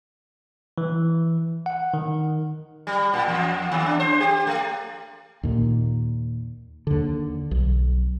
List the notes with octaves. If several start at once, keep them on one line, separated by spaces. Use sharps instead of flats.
E3
F#5
D#3
G3
A#2
E2
D#2
D4
C5
G4
A3
D#2 A#2
D#2 D3
B1